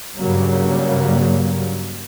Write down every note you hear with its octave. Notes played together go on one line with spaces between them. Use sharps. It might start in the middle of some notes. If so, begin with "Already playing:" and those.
G2 C#3 F#3 G3 A#3